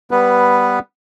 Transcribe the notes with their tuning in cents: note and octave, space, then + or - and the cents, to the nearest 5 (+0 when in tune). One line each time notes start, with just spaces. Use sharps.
G3 -5 B3 +0 B4 +0